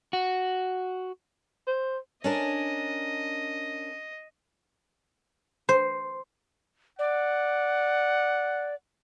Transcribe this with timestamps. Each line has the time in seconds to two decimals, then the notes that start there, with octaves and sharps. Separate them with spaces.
0.13 F#4
1.67 C5
2.24 C#4 D4 A#4 D#5
5.69 C5
6.99 D5 F#5